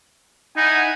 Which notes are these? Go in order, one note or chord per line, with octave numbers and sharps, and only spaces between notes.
D#4 E4 F#5 G#5